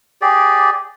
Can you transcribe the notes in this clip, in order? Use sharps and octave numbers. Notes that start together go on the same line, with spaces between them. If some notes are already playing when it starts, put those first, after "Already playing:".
G4 G#4 D5